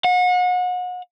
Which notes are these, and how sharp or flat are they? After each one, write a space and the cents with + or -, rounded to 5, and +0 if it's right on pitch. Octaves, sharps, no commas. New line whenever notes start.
F#5 -35